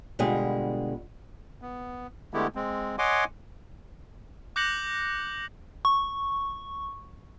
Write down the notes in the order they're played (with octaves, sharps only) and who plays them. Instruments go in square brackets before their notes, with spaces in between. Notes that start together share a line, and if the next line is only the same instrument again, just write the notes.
[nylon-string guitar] B2 D3 G3 G#3 F4 G#4
[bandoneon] B3
D3 G#3 A3 B3 E4 G4
G#3 C4
C#5 D#5 F#5 G#5 C6 D6
[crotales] D6 F#6 G6 A#6 C#7 F#7
[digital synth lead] C#6